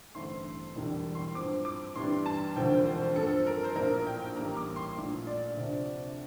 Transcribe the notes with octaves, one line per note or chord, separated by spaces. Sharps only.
A1 G2 D3 A3 C4 C6
E1 E2 D3 G3 D4
C6
G2 F3 C4 D6
D6
G2 E3 G3 D4 C6
A5
E1 D2 D3 F3 C4 G5
C5
G2 F3 C4 A4
A#4
C5
A#1 A2 F3 A#3 A#4
G5
A1 A2 G3 A#3 A#5
D6
C6
A#1 A#2 A3
D5
D2 C3 F3